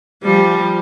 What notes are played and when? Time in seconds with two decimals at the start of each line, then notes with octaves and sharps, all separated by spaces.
0.23 F3 G3